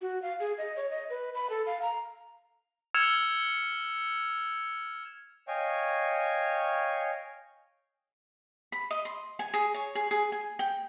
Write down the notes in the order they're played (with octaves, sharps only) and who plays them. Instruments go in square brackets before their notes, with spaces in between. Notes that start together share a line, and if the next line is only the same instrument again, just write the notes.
[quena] F#4
F5
G#4
D#5
C#5
D#5
B4
B5
A4
F5
A#5
[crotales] E6 F6 G#6 C#7 E7 F7
[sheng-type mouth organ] C#5 D#5 F5 G5 G#5 C#6
[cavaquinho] B5
D#5
C6
G#5
G#4
C#5
G#4
G#4
G#5
G5